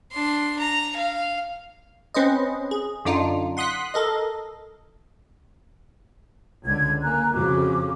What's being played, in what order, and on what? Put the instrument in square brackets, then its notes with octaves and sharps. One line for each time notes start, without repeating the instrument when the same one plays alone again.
[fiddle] D4 C6
A#5
F5
[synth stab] C4 C#4 B4 C5 D#5
G#4
F#2 D3 D4 D#4 F4
F#5 C6 D#6 F#6 B6
A4 A#4 D#5
[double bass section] C#2 D3 [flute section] G#6
[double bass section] A#3 [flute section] G#5 A#5 F#6
[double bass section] F2 C#3 F3 [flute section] F#4 D6